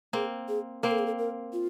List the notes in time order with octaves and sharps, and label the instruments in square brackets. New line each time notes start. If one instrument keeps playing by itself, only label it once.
[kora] A#3 C4 [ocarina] G#4
[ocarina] G#4
[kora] A#3 C4 [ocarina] A#4
[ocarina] A4
G#4
A4
A#4
F4